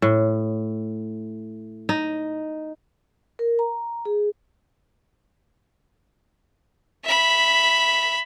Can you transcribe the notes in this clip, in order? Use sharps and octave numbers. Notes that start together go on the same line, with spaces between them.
A2
D#4
A#4
A#5
G#4
E5 B5